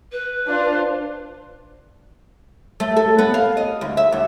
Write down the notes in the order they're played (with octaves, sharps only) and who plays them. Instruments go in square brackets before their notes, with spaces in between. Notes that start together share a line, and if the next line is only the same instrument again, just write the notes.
[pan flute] B4
[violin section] D4 F4 C5
[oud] A3
A4
B3
F5
D#5
D2
E5
D2